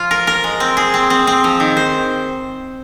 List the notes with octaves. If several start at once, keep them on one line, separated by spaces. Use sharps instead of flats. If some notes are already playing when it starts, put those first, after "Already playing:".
Already playing: F3 F4
A#4
A#4
G#3
C4
G#4
C4
C4
C4
F3
D#3
C5